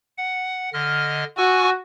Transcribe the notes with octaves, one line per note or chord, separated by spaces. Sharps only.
F#5
D3 D#5 F6
F#4 G#5 C#6 E6